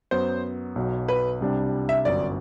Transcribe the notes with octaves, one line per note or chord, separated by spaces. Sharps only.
F#2 F#3 B3 C5
B1 B2 F#3
B4
C2 C3 G3 D4
E5
G1 F#2 F#3 D5